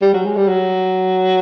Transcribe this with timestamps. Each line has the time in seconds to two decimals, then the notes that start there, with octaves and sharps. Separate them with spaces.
0.02 G3
0.14 F#3
0.25 G#3
0.37 G3
0.48 F#3